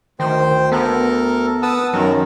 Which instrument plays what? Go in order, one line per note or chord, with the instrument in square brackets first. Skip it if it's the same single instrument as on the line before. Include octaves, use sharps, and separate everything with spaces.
[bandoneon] D2 [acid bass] D#3 [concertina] C5 G5
[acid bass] B3 [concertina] A4 A#4
[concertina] B4 F#5 A5 [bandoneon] D#6 E6
[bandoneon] F#2 D#3 [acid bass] F#3 [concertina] A#4